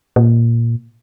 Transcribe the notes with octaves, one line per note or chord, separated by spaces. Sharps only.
A#2